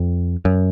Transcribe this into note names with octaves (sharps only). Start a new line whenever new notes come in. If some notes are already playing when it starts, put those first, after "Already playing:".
Already playing: F2
F#2